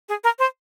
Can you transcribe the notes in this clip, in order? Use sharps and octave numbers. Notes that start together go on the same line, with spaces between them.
G#4
A#4
C5